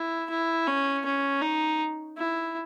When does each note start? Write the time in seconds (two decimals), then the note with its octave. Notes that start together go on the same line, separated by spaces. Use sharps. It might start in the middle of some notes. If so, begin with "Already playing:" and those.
Already playing: E4
0.30 E4
0.67 C#4
1.05 C#4
1.41 D#4
2.17 E4